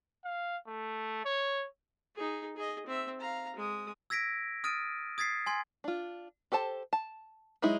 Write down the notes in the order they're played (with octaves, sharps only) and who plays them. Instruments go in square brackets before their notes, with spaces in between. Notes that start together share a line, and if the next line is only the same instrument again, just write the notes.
[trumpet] F5
A3
C#5
[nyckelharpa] D#4 G#4
G#4 D#5
C4 E5
F5 A#5
G#3 D#6
[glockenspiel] E6 G#6 A#6 B6 D7
D#6 F6 A6 D7 D#7
D#6 G#6 A6 B6 C7
G#5 C6 G#6
[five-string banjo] D4 F4
G4 A4 C5 A5
A5
F#3 G#3 D#4 E4